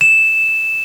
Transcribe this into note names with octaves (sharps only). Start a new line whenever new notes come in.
E7